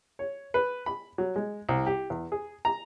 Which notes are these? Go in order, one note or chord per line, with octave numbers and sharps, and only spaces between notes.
C#5
B4
B5
F#3
G#3
C2
G4
E2
G#4
A#5